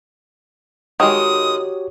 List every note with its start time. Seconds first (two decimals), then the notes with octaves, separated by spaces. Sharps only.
1.00 D#3 G#3 F#4 G4 C#5 D#6